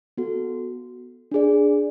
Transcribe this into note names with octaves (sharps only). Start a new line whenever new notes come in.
B3 F#4 A4
D4 G#4 D5